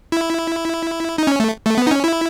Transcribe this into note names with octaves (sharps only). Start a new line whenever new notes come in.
E4
D#4
C#4
A3
A3
B3
D#4
C#4
E4